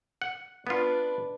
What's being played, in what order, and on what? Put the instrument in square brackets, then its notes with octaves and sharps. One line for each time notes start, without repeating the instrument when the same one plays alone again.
[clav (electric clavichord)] F#5
[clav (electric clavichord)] B3 F4 [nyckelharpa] D4 B4